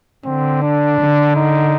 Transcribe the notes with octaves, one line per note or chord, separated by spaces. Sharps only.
D3 C4
D4
D3
D#4